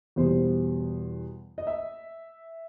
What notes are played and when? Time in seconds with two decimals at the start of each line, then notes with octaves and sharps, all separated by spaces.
0.16 E2 B2 G3 C5
1.58 D#5
1.67 E5